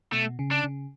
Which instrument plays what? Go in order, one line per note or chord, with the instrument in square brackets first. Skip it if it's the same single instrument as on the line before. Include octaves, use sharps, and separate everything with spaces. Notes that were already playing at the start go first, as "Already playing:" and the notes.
[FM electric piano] B2 [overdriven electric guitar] A3
[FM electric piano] C#3
[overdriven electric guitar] D4
[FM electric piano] C#3